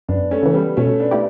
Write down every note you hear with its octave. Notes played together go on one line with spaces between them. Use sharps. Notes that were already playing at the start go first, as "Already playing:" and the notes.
F#2 B3 D4
A3 C#4
C#3 E3
G3 B3
B2 A3 C#4
B3 D4
A3 E4 G4